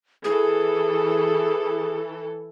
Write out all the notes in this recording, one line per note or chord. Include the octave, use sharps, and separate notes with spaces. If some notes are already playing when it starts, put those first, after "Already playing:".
E3 G#4 A4